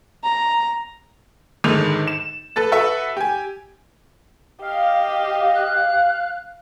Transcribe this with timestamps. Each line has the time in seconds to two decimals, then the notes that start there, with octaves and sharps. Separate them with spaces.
0.24 A#5
1.64 G#1 D3 D#3 G#3 F7
2.08 E7
2.56 A4 B4 A6
2.72 F#4 A4 B4 E5 F#5
3.17 G4 G#5
4.62 G4 D#5 F5
5.55 F#6